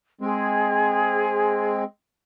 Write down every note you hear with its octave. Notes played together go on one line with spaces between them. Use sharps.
G#3 C4 G#4